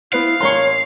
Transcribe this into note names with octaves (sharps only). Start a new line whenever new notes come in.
B3 E4 B4 C5 F5
A1 A#3 C#5 A#5 C6 C#6